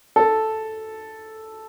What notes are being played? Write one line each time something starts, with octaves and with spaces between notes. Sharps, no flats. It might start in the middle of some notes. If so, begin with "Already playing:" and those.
A4